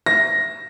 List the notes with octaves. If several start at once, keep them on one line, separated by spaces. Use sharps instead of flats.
A#6